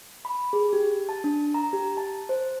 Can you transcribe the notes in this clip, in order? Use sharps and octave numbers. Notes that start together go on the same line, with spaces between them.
B5
G#4
G4
A5
D4
A#5
G4
A5
C5